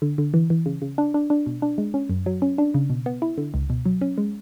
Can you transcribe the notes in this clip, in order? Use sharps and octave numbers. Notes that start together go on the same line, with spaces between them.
D3
D3
E3
E3
C#3
C#3
D4
D4
D4
B2
D4
G#3
C#4
F#2
F#3
C#4
D4
C#3
B2
B3
E4
D3
C#2
B2
F#3
C#4
G#3